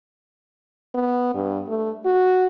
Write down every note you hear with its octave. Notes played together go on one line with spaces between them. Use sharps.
B3
G2
A3
F#4